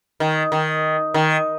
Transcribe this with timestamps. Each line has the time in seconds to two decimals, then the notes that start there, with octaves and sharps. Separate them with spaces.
0.20 D#3
0.52 D#3
1.14 D#3